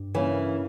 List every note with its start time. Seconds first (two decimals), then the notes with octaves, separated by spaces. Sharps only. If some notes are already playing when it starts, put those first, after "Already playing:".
Already playing: G2 G4
0.14 C#3 E3 G3 A#3 D#4 A#4